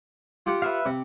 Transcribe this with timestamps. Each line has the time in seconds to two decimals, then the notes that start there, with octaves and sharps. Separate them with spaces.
0.46 F4 G4 F#5
0.62 B4 E5 F5
0.85 C3